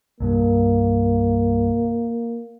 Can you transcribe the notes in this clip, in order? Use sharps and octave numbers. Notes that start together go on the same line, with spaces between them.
C2 G2 A#3